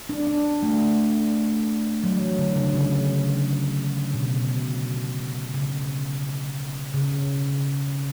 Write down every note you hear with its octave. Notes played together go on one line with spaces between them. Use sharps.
D4
D4
A3
F#3
E3
D3
C#3
C#3
B2
C#3
C#3